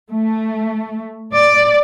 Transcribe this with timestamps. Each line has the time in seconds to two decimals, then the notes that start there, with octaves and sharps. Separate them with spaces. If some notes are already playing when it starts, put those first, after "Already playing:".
0.11 A3
1.34 D5